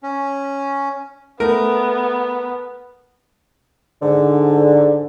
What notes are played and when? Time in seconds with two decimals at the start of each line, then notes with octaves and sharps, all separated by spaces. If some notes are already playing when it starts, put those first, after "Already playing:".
0.03 C#4
1.40 A3 B3 A#4
4.02 G#2 D3